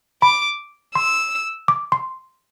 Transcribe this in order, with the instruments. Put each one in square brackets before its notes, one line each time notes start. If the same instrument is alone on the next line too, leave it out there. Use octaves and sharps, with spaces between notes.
[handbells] B5 [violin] D6
[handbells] C6 [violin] E6
[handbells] D6
C6